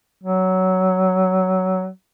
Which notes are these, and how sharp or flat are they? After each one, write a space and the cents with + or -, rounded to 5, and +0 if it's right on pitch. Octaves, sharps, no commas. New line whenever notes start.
F#3 +15